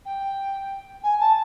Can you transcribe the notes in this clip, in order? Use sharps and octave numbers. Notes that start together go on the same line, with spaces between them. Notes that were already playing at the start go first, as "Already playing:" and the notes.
G5
G#5
A5